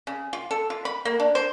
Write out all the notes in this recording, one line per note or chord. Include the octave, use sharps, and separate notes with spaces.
C#3
F4
A4
F4
B5
A#3
D4
C5